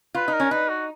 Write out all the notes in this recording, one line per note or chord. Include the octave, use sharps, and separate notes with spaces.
F4 B4
D#4
A#4
C#4
D#4 B4
F#4